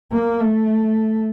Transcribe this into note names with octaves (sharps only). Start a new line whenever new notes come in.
A#3
A3